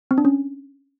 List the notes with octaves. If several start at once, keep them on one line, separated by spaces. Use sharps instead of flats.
C4
D4
C#4